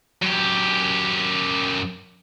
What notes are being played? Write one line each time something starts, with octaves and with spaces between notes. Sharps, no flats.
F#2 G4